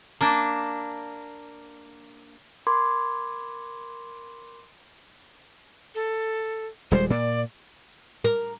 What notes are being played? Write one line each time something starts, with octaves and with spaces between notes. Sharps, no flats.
A#3 D4
A#4 B5 C6 D6 G#6
A4
D#1 G3 G#3 C5
A#2 D5
A#4